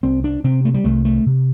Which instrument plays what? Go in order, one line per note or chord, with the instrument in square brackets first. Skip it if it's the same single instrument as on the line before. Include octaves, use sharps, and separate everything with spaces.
[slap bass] C2 C4
D4
C3 C4
A3
G3
C2 A3
A3
C3